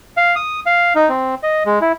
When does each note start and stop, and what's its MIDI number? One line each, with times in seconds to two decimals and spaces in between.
0.17 0.35 77
0.36 0.60 87
0.66 0.93 77
0.95 1.09 63
1.09 1.35 60
1.43 1.63 75
1.65 1.79 56
1.81 1.92 64